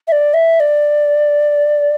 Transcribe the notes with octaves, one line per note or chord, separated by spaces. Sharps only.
E5
D5
E5
D5